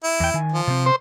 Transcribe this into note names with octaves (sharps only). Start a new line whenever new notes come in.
E4
E2 G5
D#3 G#5
F3
C3 C4
C5